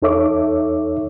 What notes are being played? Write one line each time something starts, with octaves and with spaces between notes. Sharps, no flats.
E2 D#4 A4 C#5 E5 D6